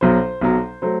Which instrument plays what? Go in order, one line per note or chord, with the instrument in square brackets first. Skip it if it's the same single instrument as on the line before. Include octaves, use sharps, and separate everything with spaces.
[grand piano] B1 B2 F#3 C5
B1 B2 F#3
F#3 A3 C5